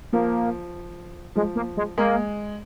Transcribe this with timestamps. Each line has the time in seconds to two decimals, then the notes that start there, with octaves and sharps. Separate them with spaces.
0.13 F3 A#3
1.35 F3 G#3
1.56 A#3
1.77 G#3
1.97 G#3 A#3